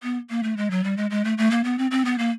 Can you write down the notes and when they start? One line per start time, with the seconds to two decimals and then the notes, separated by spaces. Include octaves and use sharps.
0.03 B3
0.30 A#3
0.43 A3
0.57 G#3
0.71 F#3
0.84 G3
0.97 G#3
1.11 G#3
1.24 A3
1.38 A3
1.51 A#3
1.64 B3
1.78 C4
1.91 C4
2.05 B3
2.18 A#3